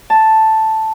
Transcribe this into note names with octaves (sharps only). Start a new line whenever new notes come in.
A5